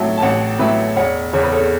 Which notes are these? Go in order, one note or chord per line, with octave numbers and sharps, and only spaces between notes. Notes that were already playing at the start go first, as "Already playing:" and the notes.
Already playing: A1 A2 F#3 E5 F#5 A5
A5
A1 C#5 F#5
A2 F#3 B4 E5
E1 C#5 F#5
E2 C#3 C#5
B4
A4 C#5